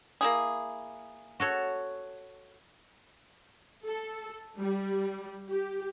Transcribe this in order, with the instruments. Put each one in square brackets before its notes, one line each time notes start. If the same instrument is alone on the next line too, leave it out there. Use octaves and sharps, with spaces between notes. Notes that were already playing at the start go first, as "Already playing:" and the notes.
[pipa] A#3 E4 G#4
[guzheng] F#4 A4 C#5
[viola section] A4
G3
G4